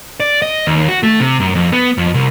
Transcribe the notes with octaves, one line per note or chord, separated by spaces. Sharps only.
D5
D#5
D#2
F#4
A3
C3
F#2
F2
B3
F2
C2